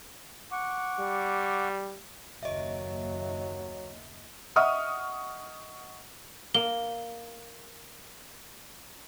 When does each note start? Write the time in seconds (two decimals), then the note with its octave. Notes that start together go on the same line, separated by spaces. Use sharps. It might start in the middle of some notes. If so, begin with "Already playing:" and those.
0.52 F#5 C#6 D6
1.00 G3
2.43 F#1 D#2 F#3 D#5 E5
4.56 D#5 E5 F#5 C#6 D#6 F6
6.55 A#3 G7